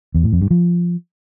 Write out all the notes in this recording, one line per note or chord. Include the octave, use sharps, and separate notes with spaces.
E2
A2
F2
G2
F3